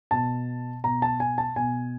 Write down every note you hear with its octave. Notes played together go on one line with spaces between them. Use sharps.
B2 A5
B2 A#5
A5
G#5
A5
B2 G#5